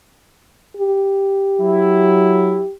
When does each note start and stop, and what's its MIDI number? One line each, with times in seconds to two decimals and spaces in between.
0.77 2.73 67
1.59 2.62 54
1.59 2.62 64